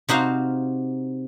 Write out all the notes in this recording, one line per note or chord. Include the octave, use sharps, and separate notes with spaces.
C3 D#4 F#4 C5 F5